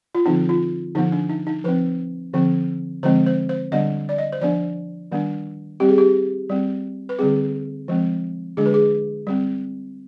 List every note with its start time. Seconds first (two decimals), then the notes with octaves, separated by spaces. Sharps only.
0.15 F4
0.26 D3 F3 C4 D#4
0.49 F4
0.95 D3 F3 B3 D#4
1.12 D4
1.29 D#4
1.47 D#4
1.64 F3 C4 B4
2.33 D3 F3 C4
3.03 D3 F3 G#3 C4 C5
3.26 C5
3.49 C5
3.72 D3 G3 B3 D4 D#5
4.09 D5
4.18 D#5
4.32 C5
4.41 F3 B3 D4 D5
5.11 D#3 G3 B3 D4
5.80 G3 C4 G4
5.89 G#4
5.98 G4
6.50 G3 C4
7.09 B4
7.19 D3 G3 C4 G#4
7.88 F3 G#3 C4
8.57 D3 G#3 D4 G#4
8.66 B4
8.74 G#4
9.27 G3 C4